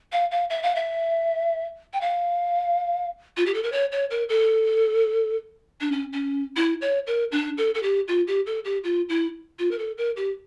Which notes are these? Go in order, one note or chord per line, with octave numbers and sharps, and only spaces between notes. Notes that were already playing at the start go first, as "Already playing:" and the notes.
F5
F5
E5
F5
E5
G5
F5
F4
G4
A4
A#4
C#5
C#5
A#4
A4
D4
C#4
C#4
E4
C#5
A#4
D4
A4
A4
G4
F4
G4
A4
G4
F4
E4
F4
A#4
A4
A#4
G4